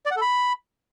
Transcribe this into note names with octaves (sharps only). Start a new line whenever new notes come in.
D5
F#5
A4
B5